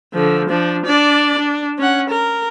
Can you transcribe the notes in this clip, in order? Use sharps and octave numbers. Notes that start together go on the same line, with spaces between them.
D3 F3
F3 D4
D4 D5
D4
C#4 F#5
A#4